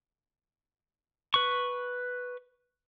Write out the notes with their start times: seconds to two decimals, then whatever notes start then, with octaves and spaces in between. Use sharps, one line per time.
1.34 B4 C#6